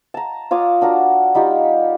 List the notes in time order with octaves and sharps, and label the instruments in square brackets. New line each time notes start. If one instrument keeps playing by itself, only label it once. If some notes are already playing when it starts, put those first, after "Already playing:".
[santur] A5 A#5
F4 C#5 D6 D#6
D4 F#4 A#4
G3 D#4 F4 G4